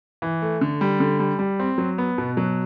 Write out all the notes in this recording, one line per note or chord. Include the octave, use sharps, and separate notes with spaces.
E3
A3
D3
G3
D3
G3
G3
C4
F#3
B3
B2
F#3